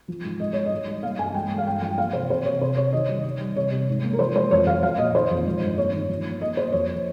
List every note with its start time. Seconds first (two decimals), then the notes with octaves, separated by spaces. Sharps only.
0.08 F3
0.25 G#2
0.40 G#2 D#5
0.53 G#2 C#5
0.66 D#5
0.72 G#2
0.87 G3
1.03 A#3 F5
1.19 G2 G#5
1.34 G#3 G5
1.51 G#3
1.58 F5
1.66 G2 G5
1.82 F3 G5
1.98 A#3 F5
2.13 C3 C5
2.30 C3 C5
2.45 C3 C#5
2.61 C3 C5
2.77 C3 C#5
2.93 D#3 D#5
3.09 G3
3.25 G3
3.40 G3
3.56 C3 C#5
3.72 C3
3.89 G#2
4.04 A#3
4.13 A#4
4.19 F3 C5
4.35 G#3 C5
4.51 F2 C#5
4.66 F2 F5
4.82 F3 F5
4.98 A#2 D#5
5.15 D#3 C5
5.31 F2
5.46 G#3
5.61 G2
5.78 A#3 C#5
5.93 D#3
6.09 F3
6.26 A#3
6.41 A#3 D#5
6.57 A#3 C5
6.72 F2 C#5